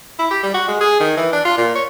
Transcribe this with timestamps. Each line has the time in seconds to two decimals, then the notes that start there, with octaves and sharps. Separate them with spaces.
0.19 E4
0.31 G4
0.43 G3
0.54 F#4
0.68 G#3
0.81 G#4
1.00 D#3
1.17 E3
1.33 D4
1.45 F4
1.58 A#2
1.75 C#5